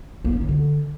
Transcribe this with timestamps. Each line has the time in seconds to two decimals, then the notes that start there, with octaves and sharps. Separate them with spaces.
0.24 A#3
0.33 C#4
0.41 D#3
0.49 D3